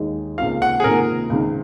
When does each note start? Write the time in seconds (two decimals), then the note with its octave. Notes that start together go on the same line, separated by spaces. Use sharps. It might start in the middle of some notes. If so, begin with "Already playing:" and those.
Already playing: D#2 D#3 G#3 D#4
0.38 C#2 C3 D#3 A#3 F4 F5
0.62 F#5
0.80 G#4
0.84 C#2 C3 D#3 A#3 F4 A#4
1.30 C#2 C3 D#3